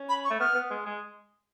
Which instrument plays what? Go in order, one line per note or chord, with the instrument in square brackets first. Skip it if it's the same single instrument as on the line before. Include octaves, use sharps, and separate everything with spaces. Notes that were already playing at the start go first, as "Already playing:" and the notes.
Already playing: [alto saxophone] C#4
[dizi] B5
C#6
[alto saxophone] A3
[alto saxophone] B3 [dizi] F6
[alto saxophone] B3
G#3
G#3